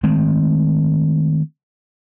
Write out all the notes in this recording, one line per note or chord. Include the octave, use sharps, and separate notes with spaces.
D#3 G#3 A3 C4